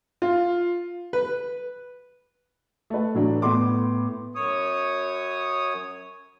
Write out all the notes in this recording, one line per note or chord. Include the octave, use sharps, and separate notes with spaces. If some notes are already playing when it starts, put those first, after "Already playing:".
F4
B4
A3 B4
A2 E3 F#3 D4
A2 B3 C6 D6
F#2 C#5 D#6